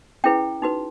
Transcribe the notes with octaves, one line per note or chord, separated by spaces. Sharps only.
C#4 E4 G#4 B4 G5
D#4 F#4 B4